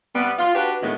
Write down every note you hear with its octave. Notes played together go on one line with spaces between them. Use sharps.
C3 G3 B3
F4
D4 F#4 G4 B4
D2 A2 D#3 G#3 B3